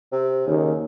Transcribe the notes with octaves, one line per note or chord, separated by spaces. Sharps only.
C3
D#2 C#3